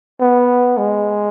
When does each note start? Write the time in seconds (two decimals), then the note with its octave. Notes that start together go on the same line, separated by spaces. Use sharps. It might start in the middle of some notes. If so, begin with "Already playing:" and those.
0.21 B3
0.77 G#3